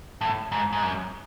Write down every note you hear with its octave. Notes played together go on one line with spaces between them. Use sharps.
A2
G#2
G#2
F#2